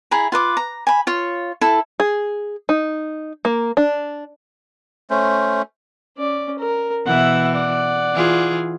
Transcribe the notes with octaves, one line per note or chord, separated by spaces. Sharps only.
E4 G#4 A#5 B5
F4 B4 D6
A#5
G#5 B5
F4 C#5
E4 A4
G#4
D#4
A#3
D4
A3 C#4 C5
C#4 D5
A#4
B2 E3 E5 F#5
D5 F#5
E3 F4 G#4